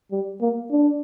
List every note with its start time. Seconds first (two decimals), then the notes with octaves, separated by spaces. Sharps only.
0.12 G3
0.42 A#3
0.71 D4